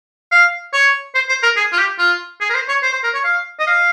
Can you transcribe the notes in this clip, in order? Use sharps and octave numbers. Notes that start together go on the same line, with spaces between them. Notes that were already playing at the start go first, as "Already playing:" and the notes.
F5
C#5
C5
C5
A#4
G#4
F4
G4
F4
G#4
A#4
C5
C#5
C5
C5
A#4
C#5
F5
D#5
F5